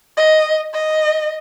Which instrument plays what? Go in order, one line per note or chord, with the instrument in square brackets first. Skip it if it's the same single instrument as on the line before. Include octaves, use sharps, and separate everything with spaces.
[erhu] D#5
D#5